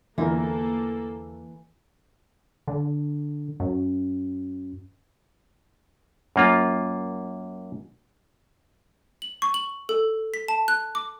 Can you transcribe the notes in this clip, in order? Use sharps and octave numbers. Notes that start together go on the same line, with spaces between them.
E2 D3 E3 A#3 F4 A4 A#4
D3
F#2
F#2 A#3 F4
F#7
C#6
F#7
A4
B6
A5
F#6
D6